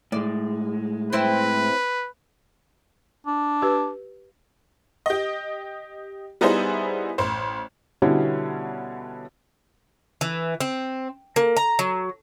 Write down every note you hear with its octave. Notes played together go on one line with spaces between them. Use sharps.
A2 G#3 D5
C4 E4 B4 E5
D4
G4 B4
G4 D#5
G3 B3 D#4 E4 G#4 C5
A1 C5
B2 D3 G3 C#4 E4 C#5
E3
C4
A#3
A#5
F#3